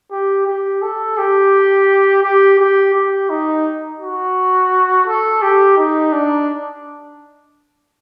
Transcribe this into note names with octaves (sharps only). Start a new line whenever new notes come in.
G4
G4
A4
G4
G4
G4
G4
D#4
F#4
A4
G4
D#4
D4